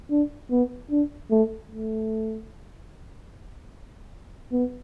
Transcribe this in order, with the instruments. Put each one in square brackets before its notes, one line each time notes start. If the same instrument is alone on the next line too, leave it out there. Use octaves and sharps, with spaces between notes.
[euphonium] D4
B3
D4
A3
A3
B3